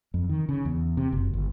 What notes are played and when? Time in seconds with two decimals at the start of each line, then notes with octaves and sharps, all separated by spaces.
0.14 F2
0.29 D#3
0.49 C#3
0.65 E2
0.97 C3
1.13 F#1
1.33 G1